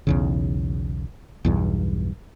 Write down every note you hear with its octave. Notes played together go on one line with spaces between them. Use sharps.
B1 E2 C#3
B1 E2 G2